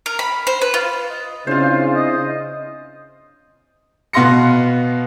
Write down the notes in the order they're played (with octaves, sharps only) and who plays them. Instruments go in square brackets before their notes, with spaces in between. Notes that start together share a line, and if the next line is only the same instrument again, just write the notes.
[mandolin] A#4
B5
C5
B4
F4
[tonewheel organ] D#5
[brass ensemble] C#3 [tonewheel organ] C4 D4 E4 [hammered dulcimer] F4 C5
[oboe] D#5
[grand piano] B2 B3 F5 C6 A#6 C#7